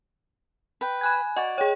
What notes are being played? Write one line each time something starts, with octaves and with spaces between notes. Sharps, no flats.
B4 G5
G#5 B5 F#6 G#6
F#4 D5 D#5
G#4 C#5 G5